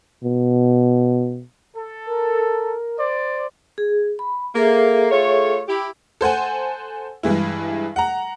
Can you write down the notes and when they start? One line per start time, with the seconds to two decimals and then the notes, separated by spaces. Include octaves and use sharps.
0.24 B2
1.76 A4
2.06 A#4
2.99 C5 D5
3.78 G#4
4.19 B5
4.55 A#3 G#4 A4 E5
5.11 A3 F4 C#5
5.68 E4 G4
6.21 A4 C5 F#5 G#5
7.23 G2 E3 G#3 E4
7.96 F#5 A#5